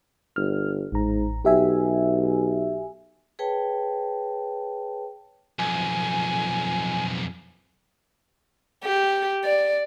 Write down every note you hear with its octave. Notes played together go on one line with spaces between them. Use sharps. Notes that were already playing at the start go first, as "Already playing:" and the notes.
G1 F6
A1 G#2 A#5
B1 G4 E5 G#5
G#4 B4 C#5 G5 A5
B1 F2 G#5
G4
D5